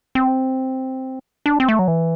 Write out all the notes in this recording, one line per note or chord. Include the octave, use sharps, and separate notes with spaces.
C4
D4
C4
A3
F#3
E3